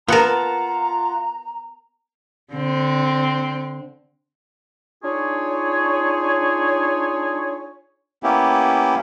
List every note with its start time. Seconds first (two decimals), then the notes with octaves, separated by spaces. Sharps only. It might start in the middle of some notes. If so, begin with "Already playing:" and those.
0.08 B3 F4 A#4 F#5 A5 A#5
2.53 D3 C4
5.03 D4 D#4 F4 G#4 C#5
8.23 A#3 B3 C#4 E4 G4